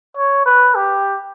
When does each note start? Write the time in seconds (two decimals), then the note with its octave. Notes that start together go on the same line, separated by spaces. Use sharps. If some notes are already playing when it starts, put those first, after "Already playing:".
0.17 C#5
0.46 B4
0.75 G4